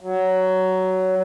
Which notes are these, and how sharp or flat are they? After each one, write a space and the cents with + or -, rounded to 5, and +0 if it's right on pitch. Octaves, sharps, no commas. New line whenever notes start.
F#3 +15